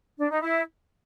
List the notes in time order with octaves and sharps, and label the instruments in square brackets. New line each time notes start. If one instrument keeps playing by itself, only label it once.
[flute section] D4
D#4
E4